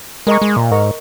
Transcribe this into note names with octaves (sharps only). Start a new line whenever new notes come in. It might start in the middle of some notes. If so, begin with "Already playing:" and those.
G#3 A#4 D#5 A#5 C#6
G#3
A#2
G#2 A#4 D#5 A#5 C#6